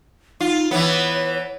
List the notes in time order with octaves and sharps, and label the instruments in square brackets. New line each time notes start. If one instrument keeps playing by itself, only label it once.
[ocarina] D#4 [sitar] F4
[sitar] E3 B3 [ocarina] C#5